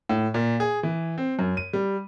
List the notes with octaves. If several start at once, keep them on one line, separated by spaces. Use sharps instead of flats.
A2
A#2
G#4
E3
C4
F#2
D#7
G3